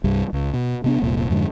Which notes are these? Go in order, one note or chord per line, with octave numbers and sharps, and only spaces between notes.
C2 G2 G3
C#2
B2
C3 B3 D4
F1 C2 A#2
F2 G#2 D3